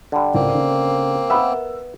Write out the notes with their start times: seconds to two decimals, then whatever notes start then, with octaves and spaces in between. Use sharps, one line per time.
0.12 D3 G3
0.34 C#2 A2 C#3 A#3 C4
0.54 C#3
1.30 B3 A#4 E5 E6